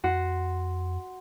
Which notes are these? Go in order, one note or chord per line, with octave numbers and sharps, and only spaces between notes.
F2 F#4 C6 C#7